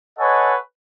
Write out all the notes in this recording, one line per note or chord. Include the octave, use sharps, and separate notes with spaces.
A4 B4 C#5 D#5 F#5 G#5